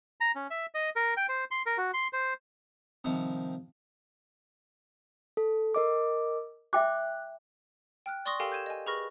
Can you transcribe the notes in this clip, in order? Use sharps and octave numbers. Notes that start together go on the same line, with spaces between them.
A#5
C#4
E5
D#5
A#4
G5
C5
C6
A#4
F#4
C6
C5
C3 D#3 F3 G3
A4
A#4 D#5 D6
E5 G5 D6 F#6
G5 F6 F#6
D5 C6 C#6 D#6 A#6
G4 A4 A#4 F5 G5 G#5
G6 G#6 D#7 E7
D#5 G#5
G#4 B4 B5 C#6 F6 A#6